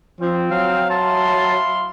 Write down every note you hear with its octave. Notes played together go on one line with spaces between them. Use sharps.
F3 C4
F#3 F5
E4 F5 A5 C6